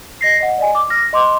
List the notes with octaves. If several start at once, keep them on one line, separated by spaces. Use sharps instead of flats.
D#5 A#6 C7
D#5 F#5
D5 D#5 G#5
D6
F6 A#6
D#5 C6 D6